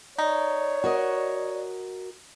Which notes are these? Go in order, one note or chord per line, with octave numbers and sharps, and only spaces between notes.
D#4 C#5 D5
F#4 A#4 D#5